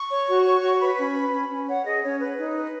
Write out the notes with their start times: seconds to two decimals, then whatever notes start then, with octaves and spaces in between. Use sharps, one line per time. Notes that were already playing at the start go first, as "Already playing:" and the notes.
Already playing: C#6
0.10 C#5
0.27 F#4
0.45 C#5
0.62 F#4
0.75 C#6
0.79 B4 B5
0.98 C#4
1.14 B4
1.32 C#4
1.49 C#4
1.68 C#5 F#5
1.85 G#4 D#5
2.03 C#4 C#5
2.20 B4
2.38 D#4
2.55 B4